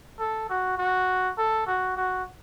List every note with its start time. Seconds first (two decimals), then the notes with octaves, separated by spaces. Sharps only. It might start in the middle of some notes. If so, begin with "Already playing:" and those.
0.19 A4
0.49 F#4
0.78 F#4
1.38 A4
1.67 F#4
1.96 F#4